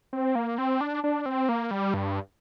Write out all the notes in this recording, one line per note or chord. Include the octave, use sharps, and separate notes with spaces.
C4
A#3
C4
D4
D4
C4
A#3
G3
G2